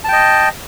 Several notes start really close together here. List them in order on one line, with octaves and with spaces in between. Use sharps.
A5 G5 D#5